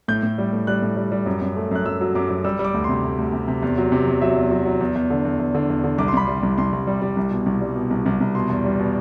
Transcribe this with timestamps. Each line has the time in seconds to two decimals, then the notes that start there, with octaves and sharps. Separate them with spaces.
0.08 A2 G6
0.23 A2
0.38 G3
0.53 A2
0.67 G3 F#6
0.82 A2
0.97 G3
1.12 G3
1.26 F#2
1.41 F#2
1.56 A3
1.71 F#2 F#6
1.85 F#2 E6
2.01 F#3
2.15 F#2 D6
2.30 F#2
2.44 G3 E6
2.59 G3
2.64 D6
2.74 D2
2.84 C3 C6
3.04 D2
3.19 D2
3.33 C3
3.48 C3
3.62 E2
3.78 F#3
3.92 C3
4.07 E2
4.22 F#3 E5
4.36 E2
4.51 F#3
4.66 F#3
4.80 E2
4.95 E2
5.10 D3
5.25 E2
5.40 E2
5.55 D3
5.70 E2
5.84 D3
5.98 C2 D6
6.08 C6
6.13 C2 B5
6.26 G3 C6
6.43 C2
6.58 C2 C6
6.73 C2
6.87 G3
7.02 G3
7.17 C2
7.31 B2
7.46 C2
7.61 G3
7.76 B2
7.91 C2
8.06 C2
8.20 C2
8.35 B2 C6
8.49 E2
8.65 G3
8.79 B2